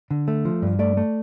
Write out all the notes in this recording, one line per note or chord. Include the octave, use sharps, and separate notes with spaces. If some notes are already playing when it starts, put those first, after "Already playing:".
D3
A3
F3
G2
A3 D5
A3